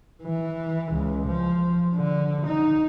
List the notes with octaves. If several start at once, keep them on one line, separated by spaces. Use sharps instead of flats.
E3
C#2
F3
D3
D#4